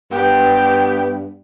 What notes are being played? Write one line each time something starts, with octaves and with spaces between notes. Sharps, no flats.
G2 B3 G4